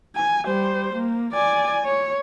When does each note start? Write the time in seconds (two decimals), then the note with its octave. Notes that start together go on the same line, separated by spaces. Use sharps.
0.16 G#5
0.47 G3 C5
0.95 A#3
1.32 D5 G#5
1.85 C#5